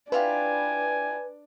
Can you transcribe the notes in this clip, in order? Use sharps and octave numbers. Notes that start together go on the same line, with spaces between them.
D4 E4 F4 G4 B4 G#5